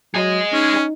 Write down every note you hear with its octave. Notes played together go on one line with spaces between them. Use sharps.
F#3 G#4 D#5
C#4 D#4